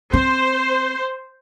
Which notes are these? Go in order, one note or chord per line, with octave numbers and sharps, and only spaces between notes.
C4 C5